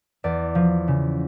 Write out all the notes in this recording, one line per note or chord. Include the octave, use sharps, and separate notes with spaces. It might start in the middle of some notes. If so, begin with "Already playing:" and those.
E2 D5
F3
C#3